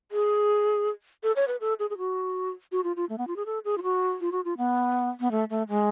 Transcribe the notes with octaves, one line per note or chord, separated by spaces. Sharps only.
G#4
A4
C#5
B4
A4
G#4
G#4
F#4
F#4
F4
F4
A3
B3
F4
G#4
A4
G#4
F4
F#4
F4
F#4
F4
B3
B3
A3
A3
G#3